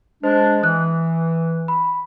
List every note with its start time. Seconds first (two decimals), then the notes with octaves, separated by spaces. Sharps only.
0.24 G#3 D4 C5
0.63 E3 D#6 F#6
1.68 B5